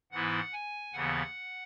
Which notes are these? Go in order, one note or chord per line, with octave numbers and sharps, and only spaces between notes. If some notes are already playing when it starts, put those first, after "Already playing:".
G#2 E3 B3 E4 F#5
G#5
D#2 C#3 E3 B3 F#5